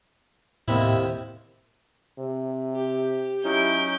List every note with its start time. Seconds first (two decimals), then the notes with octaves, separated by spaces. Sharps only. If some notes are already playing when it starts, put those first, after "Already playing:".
0.68 D#2 A2 C3 E4
2.19 C3
2.74 G4
3.44 F#3 C#4 D#4 E4 G6 D7